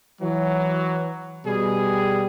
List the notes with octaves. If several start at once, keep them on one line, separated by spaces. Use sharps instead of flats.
E3 F#3
B2 G3 G#4